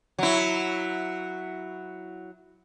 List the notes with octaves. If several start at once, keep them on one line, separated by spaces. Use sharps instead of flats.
F#3 E4